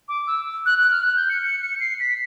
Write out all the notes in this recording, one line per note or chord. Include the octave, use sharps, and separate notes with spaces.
D6
E6
F#6
F#6
F6
F#6
G6
C#7
C#7
C#7
C7
B6